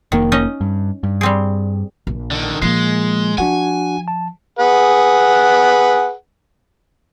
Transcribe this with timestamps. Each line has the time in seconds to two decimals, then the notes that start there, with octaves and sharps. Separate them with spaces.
0.12 F1 D#3 A#3
0.32 C#4 D#4 D#5
0.61 G2
1.03 G2
1.21 G3 C4 G#4
2.07 A#1
2.31 D3 D#3
2.62 A#2 F3 G#3 A#3 C7
3.38 F3 D4 F#4 F#5 G#5
4.08 A5
4.59 G#4 B4 F#5